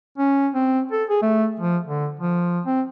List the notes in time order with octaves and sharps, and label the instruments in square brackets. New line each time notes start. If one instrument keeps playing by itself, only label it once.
[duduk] C#4
C4
A4
G#4
A3
F3
D3
F3
C4